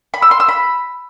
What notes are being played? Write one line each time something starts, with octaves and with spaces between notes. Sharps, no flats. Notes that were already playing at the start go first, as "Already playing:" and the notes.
B5
E6
C6
E6
B5